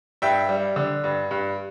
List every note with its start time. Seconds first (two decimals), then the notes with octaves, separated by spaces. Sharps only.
0.22 G2 E5 G5
0.49 G3
0.76 D3
1.04 G2
1.31 G2